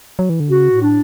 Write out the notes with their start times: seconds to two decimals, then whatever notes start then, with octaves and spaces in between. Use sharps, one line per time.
0.19 F#3
0.29 E3
0.40 D3
0.50 C#3 F#4
0.66 A2
0.81 D4